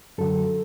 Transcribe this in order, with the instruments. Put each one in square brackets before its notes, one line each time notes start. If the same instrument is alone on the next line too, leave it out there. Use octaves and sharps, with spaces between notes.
[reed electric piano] F#2 D3 F#3 A4